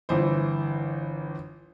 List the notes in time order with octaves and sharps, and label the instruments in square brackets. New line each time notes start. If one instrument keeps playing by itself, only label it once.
[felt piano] G1 E3 C5